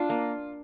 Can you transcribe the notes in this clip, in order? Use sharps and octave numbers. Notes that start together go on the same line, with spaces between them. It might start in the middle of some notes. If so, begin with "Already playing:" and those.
Already playing: D4 F4
A#3